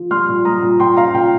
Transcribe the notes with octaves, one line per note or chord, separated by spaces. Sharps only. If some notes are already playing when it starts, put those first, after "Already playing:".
Already playing: F3
G3 C6 F6
A#2
G3 A#5 D#6
A#2
A#2 G5 C6
A#2 F5 A#5
A#2 G5